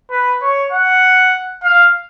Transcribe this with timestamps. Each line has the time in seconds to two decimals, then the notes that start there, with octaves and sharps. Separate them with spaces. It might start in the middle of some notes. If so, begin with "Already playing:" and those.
0.11 B4
0.42 C#5
0.72 F#5
1.63 F5